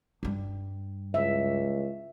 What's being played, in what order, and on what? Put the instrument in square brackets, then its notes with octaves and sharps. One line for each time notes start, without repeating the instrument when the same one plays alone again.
[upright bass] G2 G3
[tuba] C#2 [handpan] E5